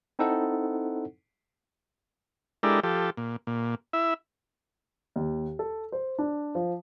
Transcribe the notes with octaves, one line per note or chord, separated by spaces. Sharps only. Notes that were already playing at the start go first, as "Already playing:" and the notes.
C4 D#4 E4 A4 C5 F#5
G#3 D4 E4 G4 A4 A#4
F3 G4 A4
A#2
A#2
E4 E5
D#2
A4
C5
D4
F3